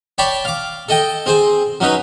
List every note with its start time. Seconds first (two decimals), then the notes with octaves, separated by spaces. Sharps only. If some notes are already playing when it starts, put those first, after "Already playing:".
0.18 C#5 D5 G5 A5 B5
0.45 F5 D6
0.89 A4 D#5 G5
1.26 C4 G#4 C5
1.81 F#3 C#4 D#4 B4